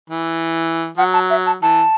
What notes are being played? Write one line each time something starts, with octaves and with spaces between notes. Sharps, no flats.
E3
F#3 F#5
A5
E5
A5
E3 A5